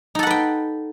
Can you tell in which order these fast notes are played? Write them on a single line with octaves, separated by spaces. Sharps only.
D#4 A4 F#5 B4 G5